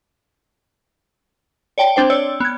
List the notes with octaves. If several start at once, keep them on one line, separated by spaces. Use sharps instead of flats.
C#5 D5 G5 A5
C4 D4 C5 G5
C#5 D5 E6
B3 G#6